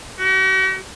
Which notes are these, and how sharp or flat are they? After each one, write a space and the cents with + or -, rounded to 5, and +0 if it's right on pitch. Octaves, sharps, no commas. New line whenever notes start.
F#4 +45